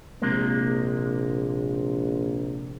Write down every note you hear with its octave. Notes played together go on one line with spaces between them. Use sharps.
A#1 C3 G#3 A#3